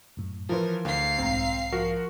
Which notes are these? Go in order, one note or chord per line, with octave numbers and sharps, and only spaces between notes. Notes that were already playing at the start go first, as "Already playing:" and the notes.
F#2 A2
E3 F3 F4 A#4 C5
D2 F5 C7
B1 G#2 C4 A#5
F3 F#4 A#4